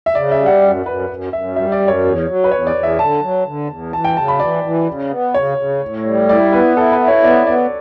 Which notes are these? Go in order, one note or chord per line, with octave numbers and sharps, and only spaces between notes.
E5
C#3 D5
E5
G3
F#5
F#2
F#2 B4
F#2
F#2 E5
G3 E5
D5
F#2
C#5
E2
F#3
B4
E2 C#5
D5
E2
E5
D3 A5
F#3
D3
E2
E3 A5
G5
C#3 A5
B5
E3 D5
E3
C#3
B3
C#3 C#5
C#3
A2
G3
E4 D5
B3 B4
E4 A4
B4
E4
C#5
B3 D5
B3 D5